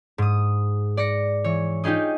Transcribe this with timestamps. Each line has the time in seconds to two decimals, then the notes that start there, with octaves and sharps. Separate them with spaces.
0.18 G#2 D#6
0.97 D5 A#6 C#7
1.44 E3 C#5
1.84 D#4 F4 G4 G#4 D#5